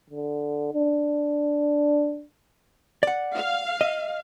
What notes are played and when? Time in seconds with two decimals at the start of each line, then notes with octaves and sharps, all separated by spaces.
0.10 D3
0.73 D4
3.03 D5 F#5
3.35 F5
3.81 D#5